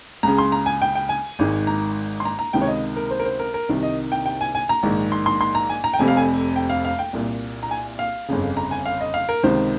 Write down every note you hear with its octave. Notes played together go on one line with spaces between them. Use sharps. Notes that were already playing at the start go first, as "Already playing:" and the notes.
C#2 C#3 A#5
C6
A#5
G#5
G5
G5
G#5
G#1 G#2 D#3
A#5
C6
A#5
A#5
C#2 C3 D#3 G5
C#5
D#5
A#4
C5
A#4
C5
A#4
A#4
C2 C3 D#3
D#5
G5
G5
G#5
G#5
A#5
A#1 G#2 D#3
C6
C6
C6
A#5
G#5
A#5
G5
F1 F2 C3 G#5
F5
G#5
G5
F5
F5
G5
C2 A#2
A#5
G#5
F5
G1 F2 C#3
A#5
G#5
F5
D#5
F5
A#4
C#2 C3 D#3 C5